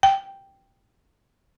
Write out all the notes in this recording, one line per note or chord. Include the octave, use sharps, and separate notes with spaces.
G5